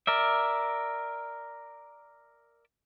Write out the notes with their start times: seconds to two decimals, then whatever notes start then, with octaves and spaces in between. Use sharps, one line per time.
0.07 A#4 D5 E5